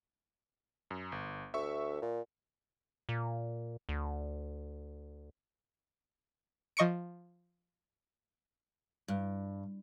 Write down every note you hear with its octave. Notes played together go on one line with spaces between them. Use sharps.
F#2
G1
D2 E5 C#6
A#2
A#2
D2
F3 D#5 C#6 C#7 D7
G2